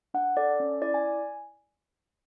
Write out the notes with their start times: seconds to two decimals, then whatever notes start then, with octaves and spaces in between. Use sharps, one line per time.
0.14 D4 F#5
0.37 A4 D5
0.60 C#4
0.81 E4 D5
0.94 G#5